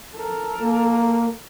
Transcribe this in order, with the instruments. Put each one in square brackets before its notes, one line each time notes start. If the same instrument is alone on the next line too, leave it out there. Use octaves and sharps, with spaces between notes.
[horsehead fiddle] A4 A#4
[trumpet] A#3